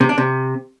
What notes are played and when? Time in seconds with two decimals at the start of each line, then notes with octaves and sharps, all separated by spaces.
0.01 C3
0.09 D4
0.18 C3